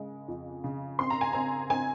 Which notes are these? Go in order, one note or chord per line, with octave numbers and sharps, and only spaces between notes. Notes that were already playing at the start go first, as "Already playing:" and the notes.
Already playing: C#3 G#3
F2
C#3
C4 C6
A#5
G#5
C4 A#5
C4 G#5